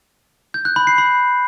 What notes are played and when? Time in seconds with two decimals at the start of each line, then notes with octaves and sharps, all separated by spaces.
0.54 G6
0.65 F#6
0.76 B5
0.87 C7
0.98 B5